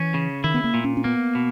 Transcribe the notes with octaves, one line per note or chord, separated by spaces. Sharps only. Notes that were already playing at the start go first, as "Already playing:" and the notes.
Already playing: E3 C#4
C#3
D#3 E4
B3
A#3
A#2
C#4
C#4
A#3 B3
B2